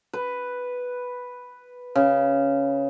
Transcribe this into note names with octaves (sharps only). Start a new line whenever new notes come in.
B4
C#3